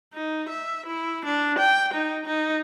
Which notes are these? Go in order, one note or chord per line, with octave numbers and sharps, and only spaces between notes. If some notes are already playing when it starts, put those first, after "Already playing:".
D#4
E5
E4
D4
G5
D#4
D#4